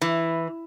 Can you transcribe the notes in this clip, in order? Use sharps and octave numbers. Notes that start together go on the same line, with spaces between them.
E3